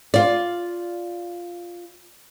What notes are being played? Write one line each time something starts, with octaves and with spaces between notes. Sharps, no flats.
F4 D5